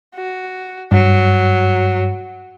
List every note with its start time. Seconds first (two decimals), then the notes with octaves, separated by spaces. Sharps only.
0.15 F#4
0.92 G2 F#3